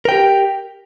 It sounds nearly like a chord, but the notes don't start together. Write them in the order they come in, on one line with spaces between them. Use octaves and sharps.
A#4 G5 G4